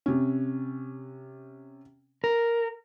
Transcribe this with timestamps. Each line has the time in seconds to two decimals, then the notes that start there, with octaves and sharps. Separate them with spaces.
0.06 C3 C#4
2.24 A#4